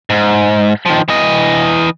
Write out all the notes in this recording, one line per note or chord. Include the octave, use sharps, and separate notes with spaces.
G#2
D#3 F3
E3 D#5